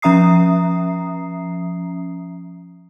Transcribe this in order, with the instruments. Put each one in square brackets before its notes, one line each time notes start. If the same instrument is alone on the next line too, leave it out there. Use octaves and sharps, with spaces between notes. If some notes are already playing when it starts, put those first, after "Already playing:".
[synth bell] F3 C#4 E5 A#5 D#6 C7